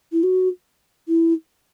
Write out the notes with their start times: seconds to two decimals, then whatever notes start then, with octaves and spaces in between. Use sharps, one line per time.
0.12 E4
0.23 F#4
1.08 E4